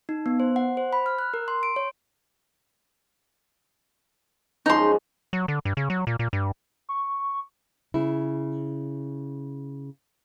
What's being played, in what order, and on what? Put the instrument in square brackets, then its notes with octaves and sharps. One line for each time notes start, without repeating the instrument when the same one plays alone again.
[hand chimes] D#4
B3
C5
F#5
C5
B5
F6
F#6
A#4
C6
D7
C#5
[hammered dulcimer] F#2 F3 G#3 [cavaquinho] D#4 C6
[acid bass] F#3
D3
G2
C#3
F#3
A#2
A#2
G2
[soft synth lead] C#6
[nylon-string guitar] C#3 E4